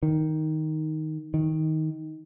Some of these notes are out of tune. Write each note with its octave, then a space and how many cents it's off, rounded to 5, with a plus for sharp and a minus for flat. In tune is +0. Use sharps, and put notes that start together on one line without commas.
D#3 +5
D#3 +15